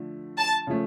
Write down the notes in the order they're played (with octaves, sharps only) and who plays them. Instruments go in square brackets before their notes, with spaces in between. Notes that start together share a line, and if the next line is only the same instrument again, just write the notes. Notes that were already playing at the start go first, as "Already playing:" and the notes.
Already playing: [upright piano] D3 F3 A3
[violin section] A5
[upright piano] C#3 F3 A3